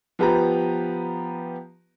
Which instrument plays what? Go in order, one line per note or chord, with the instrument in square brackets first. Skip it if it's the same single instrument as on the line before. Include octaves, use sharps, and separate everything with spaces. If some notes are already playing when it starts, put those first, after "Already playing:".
[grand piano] F3 B3 G4 B4 A#5